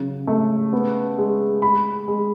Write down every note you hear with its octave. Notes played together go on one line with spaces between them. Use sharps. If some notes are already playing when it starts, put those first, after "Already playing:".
Already playing: C#3 F#3
A3
B3
G#3
G#3 B5
G#3